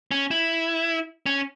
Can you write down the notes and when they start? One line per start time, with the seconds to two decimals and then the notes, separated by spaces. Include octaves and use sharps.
0.11 C#4
0.31 E4
1.26 C#4